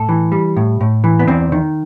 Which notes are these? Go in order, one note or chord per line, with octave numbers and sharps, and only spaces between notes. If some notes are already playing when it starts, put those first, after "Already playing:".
Already playing: A2 A4
E3
G3
A2
A2
E3
B3
E2 C4
D#3